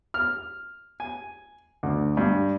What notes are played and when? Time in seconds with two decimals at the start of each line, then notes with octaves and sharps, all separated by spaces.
0.14 F6
1.00 G#5
1.83 D2
2.17 G2